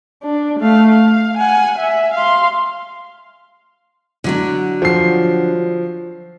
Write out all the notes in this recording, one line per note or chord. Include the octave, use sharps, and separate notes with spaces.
D4
A3 F5
F5
F#5 G#5
E5
F5 C6
D3 F#3 D4
F3 C7